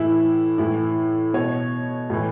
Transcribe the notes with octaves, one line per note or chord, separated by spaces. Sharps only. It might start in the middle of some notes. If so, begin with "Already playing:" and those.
Already playing: A2 E3 E4
A2 E3 E4
B2 C#5
A2 E3